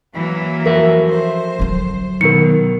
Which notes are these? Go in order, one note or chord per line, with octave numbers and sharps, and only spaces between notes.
E3 F#3 A#3
F2 F#4 A#4 E5
C5
D3 F#3
B2 D#3 A#4 C#7